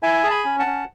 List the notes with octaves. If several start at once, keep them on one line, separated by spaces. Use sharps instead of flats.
E4 E5 G#5
G#4 A5
G#5 B5
C#4
F#5 A5
C#4